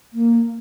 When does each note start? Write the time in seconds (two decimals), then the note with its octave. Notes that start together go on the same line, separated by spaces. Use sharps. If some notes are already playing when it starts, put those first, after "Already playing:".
0.14 A#3